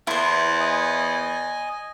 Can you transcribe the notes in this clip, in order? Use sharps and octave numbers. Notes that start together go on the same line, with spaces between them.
E2 E4 C5
D#5 G#5